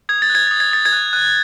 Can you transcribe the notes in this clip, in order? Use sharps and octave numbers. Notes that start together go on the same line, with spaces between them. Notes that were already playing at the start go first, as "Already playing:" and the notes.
D#6 G#6
A6
F#6
G#6
D#6 A6
G#6
D#6 A6
G#6
F#6
F#6